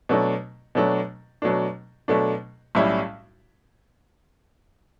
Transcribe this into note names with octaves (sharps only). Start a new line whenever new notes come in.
B2 F#3 A3 D4
B2 F#3 A3 D4
B2 F#3 A3 D4
B2 F#3 A3 D4
B1 A2 G3 C#4 E4